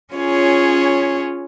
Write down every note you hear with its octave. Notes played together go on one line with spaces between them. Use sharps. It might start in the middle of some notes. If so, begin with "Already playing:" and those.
C#4 F4 G#4 C#5